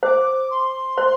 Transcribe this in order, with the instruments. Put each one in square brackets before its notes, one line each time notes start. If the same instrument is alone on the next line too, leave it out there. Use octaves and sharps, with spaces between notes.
[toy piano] C5 [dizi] D6
[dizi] C6
[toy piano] C5